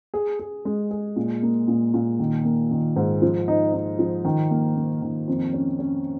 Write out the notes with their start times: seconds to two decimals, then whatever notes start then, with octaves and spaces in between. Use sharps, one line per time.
0.14 G#4
0.39 G#4
0.65 G#3
0.91 G#4
1.16 A#2
1.42 A#3
1.68 A#2
1.94 A#2
2.19 D#3
2.45 A#3
2.71 D#3
2.96 G#2
3.22 F3
3.48 D#4
3.73 D#4
3.99 F3
4.25 D#3
4.51 A#3
4.77 A#3
5.02 D#3
5.28 F2
5.53 C#4
5.79 C#4